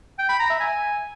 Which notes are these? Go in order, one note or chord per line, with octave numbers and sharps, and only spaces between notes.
G5
B5
A#5
E5
G#5